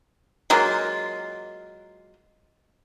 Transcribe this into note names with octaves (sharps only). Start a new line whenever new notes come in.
F#3 G#3 A#3 F4